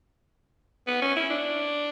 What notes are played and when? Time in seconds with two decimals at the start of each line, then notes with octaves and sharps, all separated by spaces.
0.87 B3
1.02 C#4
1.16 E4
1.30 D4